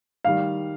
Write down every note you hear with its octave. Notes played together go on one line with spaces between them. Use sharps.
D#3 G3 F5